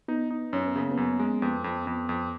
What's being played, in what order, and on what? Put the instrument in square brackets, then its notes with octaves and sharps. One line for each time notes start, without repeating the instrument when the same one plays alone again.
[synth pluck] B3 [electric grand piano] D#4
[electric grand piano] D#4
[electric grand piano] F#2 [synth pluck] C#4
[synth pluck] B3
[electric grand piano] C#3 [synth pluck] A#3
[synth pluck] B3
[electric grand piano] F#2
G#3
[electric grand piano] F2 [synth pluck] B3
[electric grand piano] F2
[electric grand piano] F2 [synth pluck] B3
[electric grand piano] F2